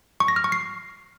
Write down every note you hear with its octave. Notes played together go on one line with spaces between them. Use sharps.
C#6
A#6
F6
C#6
C7